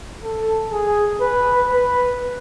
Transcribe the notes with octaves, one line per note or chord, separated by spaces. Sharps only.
A4
G#4
B4
B4